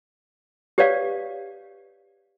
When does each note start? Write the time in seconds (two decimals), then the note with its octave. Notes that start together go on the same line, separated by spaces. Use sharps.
0.78 G4 B4 C#5 D5 F5